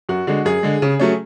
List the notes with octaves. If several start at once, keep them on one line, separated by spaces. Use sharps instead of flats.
F#2 F#4
D3 G#3 F#4
F#2 G#4
D3 G#3
C#3
F#3 A3 C#4